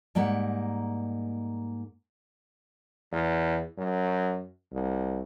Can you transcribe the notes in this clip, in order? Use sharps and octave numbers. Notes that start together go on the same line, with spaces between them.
G#2 G3 A#3 F#5
E2
F#2
C2